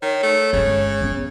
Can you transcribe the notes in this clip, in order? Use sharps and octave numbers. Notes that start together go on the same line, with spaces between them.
D#3 C#5
A3
G1 C#3 G#3
B3 C#4